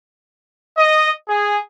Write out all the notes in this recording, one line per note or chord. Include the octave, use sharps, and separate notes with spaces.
D#5
G#4